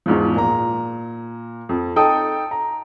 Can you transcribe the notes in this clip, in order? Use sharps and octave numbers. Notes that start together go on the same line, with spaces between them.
E2 G#2 F3
A#2 A#5
F2
D#4 A4 G5 A5 D#6
A#5